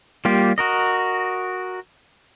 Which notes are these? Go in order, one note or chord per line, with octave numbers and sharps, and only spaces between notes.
G3 A#3 F4 G4
F#4 A#4 D#5